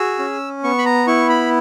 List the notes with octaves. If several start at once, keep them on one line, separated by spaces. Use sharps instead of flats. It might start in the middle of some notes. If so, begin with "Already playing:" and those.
Already playing: F#4 G#4 E6
C#4
B3 C#6
B5
A#5
E4 C#6
B5